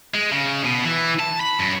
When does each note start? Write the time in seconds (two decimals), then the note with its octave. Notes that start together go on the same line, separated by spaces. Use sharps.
0.14 G#3
0.32 C#3
0.65 B2
0.84 E3
1.19 A5
1.40 B5
1.59 F#2